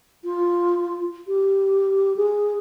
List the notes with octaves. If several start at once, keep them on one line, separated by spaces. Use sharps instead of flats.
F4
G4
G#4